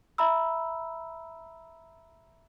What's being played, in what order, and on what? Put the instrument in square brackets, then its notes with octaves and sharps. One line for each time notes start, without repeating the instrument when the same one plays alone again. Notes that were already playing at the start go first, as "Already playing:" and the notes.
[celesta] E5 A#5 B5 E6